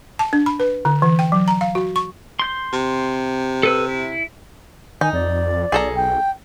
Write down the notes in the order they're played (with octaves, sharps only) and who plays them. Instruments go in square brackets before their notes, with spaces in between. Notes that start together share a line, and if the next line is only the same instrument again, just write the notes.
[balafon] A5
D4
B5
B4
D3
E3
G5
F#3
A#5
F5
F#4
C#6
[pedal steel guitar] C6 G6
[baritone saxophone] C3
[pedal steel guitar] A4 B4 E6
E4
[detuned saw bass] D#3 [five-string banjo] D#4 [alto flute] G#5
[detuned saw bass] F2 [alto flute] D5
[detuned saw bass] B1 [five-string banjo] G#4 A4 A#5
[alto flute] G5